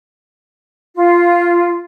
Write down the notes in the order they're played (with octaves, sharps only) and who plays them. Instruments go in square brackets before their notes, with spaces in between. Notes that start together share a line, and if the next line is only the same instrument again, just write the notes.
[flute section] F4